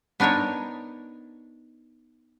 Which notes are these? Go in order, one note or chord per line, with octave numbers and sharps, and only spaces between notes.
B3 D4 D#4 A#4 C#5